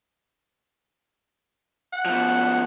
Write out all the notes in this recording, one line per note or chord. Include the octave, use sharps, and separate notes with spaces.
F#5
B2 F3